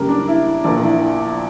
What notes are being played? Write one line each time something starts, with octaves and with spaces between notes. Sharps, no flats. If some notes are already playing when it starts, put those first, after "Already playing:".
Already playing: F#2 C#3 G3 A#3 A#4
D4
E4
A#1 A#2 A#3 D4
E4